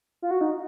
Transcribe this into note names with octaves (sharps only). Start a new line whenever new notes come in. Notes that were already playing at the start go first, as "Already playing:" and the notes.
F4
F#4
D#4